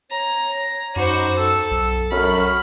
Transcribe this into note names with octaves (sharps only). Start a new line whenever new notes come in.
C#5 A#5
F#2 D#4 F#4 C5 B5 D6
A4 E6
B1
F#2 B5 C#6 F6